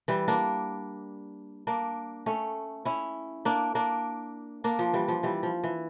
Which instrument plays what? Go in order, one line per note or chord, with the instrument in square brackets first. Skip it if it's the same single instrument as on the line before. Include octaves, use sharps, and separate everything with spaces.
[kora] E3 G3
A#3 D4
A#3 D4
A3 C#4
C#4 E4
A#3 D4
A#3 D4
A#3 D4
F3
E3 G3
F3
E3 G3
F3
E3